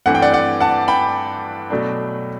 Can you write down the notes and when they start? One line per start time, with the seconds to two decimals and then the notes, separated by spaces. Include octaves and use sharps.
0.06 G2 E3 A3 C4 F#5
0.15 G5
0.22 D5 F#5
0.33 D5 F#5
0.60 F#5 A5
0.88 G5 B5
1.70 B2 F#3 A3 D4